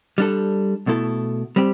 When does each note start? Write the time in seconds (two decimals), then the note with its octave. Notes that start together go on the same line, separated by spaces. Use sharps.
0.18 G3 D4 A4
0.87 B2 A3 E4 A4
1.56 G3 C4 G4